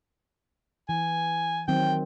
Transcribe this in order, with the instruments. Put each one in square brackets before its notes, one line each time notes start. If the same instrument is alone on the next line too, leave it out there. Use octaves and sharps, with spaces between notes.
[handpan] E3 [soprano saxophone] G#5
[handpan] D#3 F#3 C4 [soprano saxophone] G5